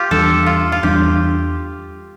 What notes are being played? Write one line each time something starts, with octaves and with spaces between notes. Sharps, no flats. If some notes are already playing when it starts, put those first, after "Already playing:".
Already playing: F4 G4
E2 E3 G3 D4 A4
F4
F4
E2 E3 G3 D4 G4